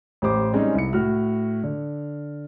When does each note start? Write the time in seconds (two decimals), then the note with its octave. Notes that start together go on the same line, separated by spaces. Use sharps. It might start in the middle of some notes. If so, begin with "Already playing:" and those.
0.22 A1 G4 C5 D6
0.53 G3 G#3 C4 C#4 D#4
0.75 C2 E4 C#7
0.93 A2 F#4 F6
1.64 D3